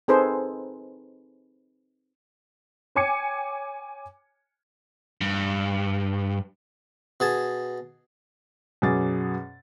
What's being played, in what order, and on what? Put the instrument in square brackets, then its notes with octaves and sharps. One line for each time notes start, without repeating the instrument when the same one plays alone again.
[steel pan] C4 D#4 G#4 A4 B4 C5
[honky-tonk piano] C#5 G5 G#5 D6 G#6 C#7
[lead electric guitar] G2
[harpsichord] B2 G#4 A5
[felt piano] F#2 B2 C#4 G#4 D6 A6